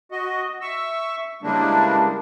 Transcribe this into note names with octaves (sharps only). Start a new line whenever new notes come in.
F#4 D#5
E5 C#6 E6
C#3 E3 G3 G#3 A#3 D4